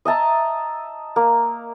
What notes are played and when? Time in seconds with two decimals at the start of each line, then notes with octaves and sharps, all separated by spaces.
0.05 D#5 E5 A5 A#5
1.16 A#3